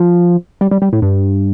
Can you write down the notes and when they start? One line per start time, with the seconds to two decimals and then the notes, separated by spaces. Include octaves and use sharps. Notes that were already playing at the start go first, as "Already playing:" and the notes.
Already playing: F3
0.61 G3
0.71 G3
0.82 G3
0.93 A2
1.02 G2